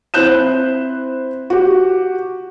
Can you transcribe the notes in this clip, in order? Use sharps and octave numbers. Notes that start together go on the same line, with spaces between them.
C4 E4 C5 F#6 G6 E7
F#4 G4